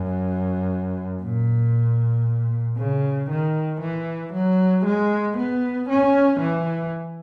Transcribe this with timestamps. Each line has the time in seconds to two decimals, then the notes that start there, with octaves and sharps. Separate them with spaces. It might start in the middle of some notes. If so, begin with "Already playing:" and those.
Already playing: F#2
1.22 A#2
2.78 C#3
3.30 D#3
3.81 E3
4.33 F#3
4.85 G#3
5.37 B3
5.89 C#4
6.40 E3